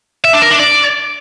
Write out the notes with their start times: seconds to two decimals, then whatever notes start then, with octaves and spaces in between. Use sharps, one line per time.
0.25 E5
0.33 D4
0.42 A#4
0.51 D4
0.59 D5